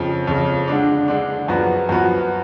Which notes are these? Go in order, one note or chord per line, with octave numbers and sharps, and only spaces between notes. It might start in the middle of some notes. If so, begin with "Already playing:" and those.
Already playing: F2 C#3 F3
F2 C#3 F3
D3 G#3 D4
D3 G#3 D4
F#2 F3 B3 F#4
F#2 F3 B3 F#4